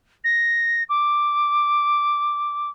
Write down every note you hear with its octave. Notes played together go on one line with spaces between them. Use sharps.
A#6
D6